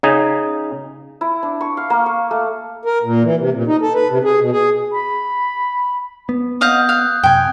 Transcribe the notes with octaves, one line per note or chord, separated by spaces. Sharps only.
C#3 D#4 G#5
E4
D4
C#6
F5
A#3
C#6
A3
A#4
A#2
E3
C3
A#2
D#4
A4
B4
C3
G#4
B2
G#4
B5
B3
D#5 F5 F#5 D#6 G6
F5 F#6
F#2 C3 G5 G#5